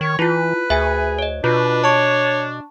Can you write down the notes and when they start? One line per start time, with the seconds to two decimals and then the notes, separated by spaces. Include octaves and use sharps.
0.01 D#3 C#5
0.19 E3 E4 F4 B4
0.70 D2 G#4 E5 G#5
1.19 C#5 D#5
1.44 B2 D4 F4 B4
1.84 C#5 A5 C#6